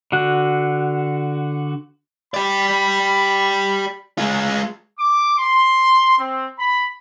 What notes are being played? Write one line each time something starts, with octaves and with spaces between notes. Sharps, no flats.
D3 F#4
G4 D5 B5
G#3 F4
D6
C6
C4
B5